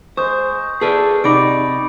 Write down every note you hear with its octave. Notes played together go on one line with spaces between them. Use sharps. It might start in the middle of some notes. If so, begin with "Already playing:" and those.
G#3 C5 C#6 D#6 G6
G#4 A4 B4 D5
C3 D#4 D5 B5 D6 D7